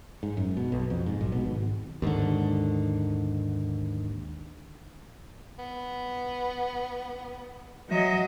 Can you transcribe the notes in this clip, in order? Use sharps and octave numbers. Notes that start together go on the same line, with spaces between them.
G#2
F#2
B2
B1
F2
G#2
B1
B2
G#1
D#2 G#2 D3
B3
F#3 D#5 E5